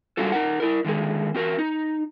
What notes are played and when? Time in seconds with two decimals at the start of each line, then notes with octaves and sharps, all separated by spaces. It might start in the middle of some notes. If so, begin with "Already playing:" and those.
0.17 G3 D4 F4 F#4 A4
0.32 D#4 A#4 F#5
0.60 E4 A#4
0.85 D3 D#3 G#3 G#4
1.35 C4 F#4 A#4
1.59 D#4